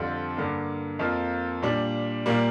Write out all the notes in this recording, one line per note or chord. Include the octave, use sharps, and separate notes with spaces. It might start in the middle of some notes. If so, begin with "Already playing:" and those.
Already playing: F2 D3 G3 C4 F4
G2 D3 A#3
F2 F3 A#3 F4
A#2 G3 D4
A#2 G3 A#3